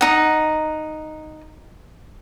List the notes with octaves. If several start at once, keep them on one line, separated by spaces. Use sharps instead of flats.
D#4 F#5